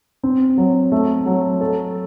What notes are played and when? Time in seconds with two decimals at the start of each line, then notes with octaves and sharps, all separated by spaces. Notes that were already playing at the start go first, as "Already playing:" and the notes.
0.23 C4
0.57 F#3
0.92 A3
1.26 F#3
1.61 A4